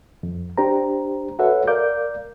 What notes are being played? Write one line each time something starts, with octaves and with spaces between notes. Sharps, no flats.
F2
D4 G4 C5 A#5
F#4 A4 B4 C#5 E5 F#5
A#4 D5 F5 D6 G6